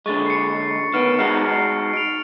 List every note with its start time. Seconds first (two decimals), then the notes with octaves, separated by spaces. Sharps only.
0.06 D3 G#3 C#6 A6
0.26 C7 C#7
0.94 D#3 B3 F6 C#7 D7
1.19 G#3 D#4 F#4 F6 C7
1.94 D7 F7